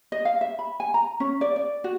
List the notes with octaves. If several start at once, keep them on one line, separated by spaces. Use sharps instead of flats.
D#5
F5
E5
B5
G#5
A#5
C#4
D5
D5
F#4